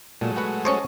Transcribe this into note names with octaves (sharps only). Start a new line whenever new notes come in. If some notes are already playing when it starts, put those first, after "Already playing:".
A#2 F#3 G#3 A3
F#4 B4 F#5
C#4 C5 C#5 D#5 A5 C#6